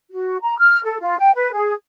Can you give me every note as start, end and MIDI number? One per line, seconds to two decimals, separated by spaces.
0.11 0.37 66
0.43 0.57 82
0.58 0.80 89
0.84 0.98 69
1.00 1.16 65
1.19 1.32 79
1.35 1.52 71
1.53 1.73 68